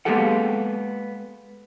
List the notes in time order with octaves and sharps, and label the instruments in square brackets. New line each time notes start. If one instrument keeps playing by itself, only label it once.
[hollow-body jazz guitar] G#3 A#3 B3 G4 A4 F#5